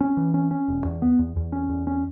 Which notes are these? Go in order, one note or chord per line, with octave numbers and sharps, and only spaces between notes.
C#4
E3
C#4
C#4
E1
E2
B3
E2
E2
C#4
E2
C#4